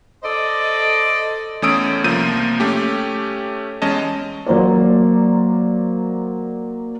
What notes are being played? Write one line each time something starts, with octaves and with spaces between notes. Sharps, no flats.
A4 C5 D5 D#5
E2 A3 C#4 D#6 E6 D7
C2 F3 A#3 G6 D#7
A3 C#4 G4
E2 G#3 C#4 D#5 A5
F#3 A#3 C5 D5